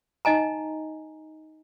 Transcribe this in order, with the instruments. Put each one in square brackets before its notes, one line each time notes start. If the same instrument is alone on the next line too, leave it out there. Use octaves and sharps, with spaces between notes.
[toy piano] D#4 D#5 G#5 A#5